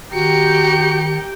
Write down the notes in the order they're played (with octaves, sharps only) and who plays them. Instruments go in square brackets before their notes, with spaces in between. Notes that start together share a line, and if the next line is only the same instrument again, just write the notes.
[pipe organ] D#3 [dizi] F#4 [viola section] G4 G5 [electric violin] A#5 C#7